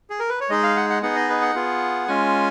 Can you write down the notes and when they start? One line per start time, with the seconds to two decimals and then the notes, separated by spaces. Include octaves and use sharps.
0.10 G#4
0.20 A#4
0.29 B4
0.40 C#5
0.50 G#3 D#4 G#4 D#5
0.63 F5
0.77 F#5
0.90 F#5
1.02 B3 D#4 G#4 F#5
1.16 D#5
1.29 B4
1.42 F#5
1.55 B3 F4 G#4
2.07 G#3 C#4 F4 G#5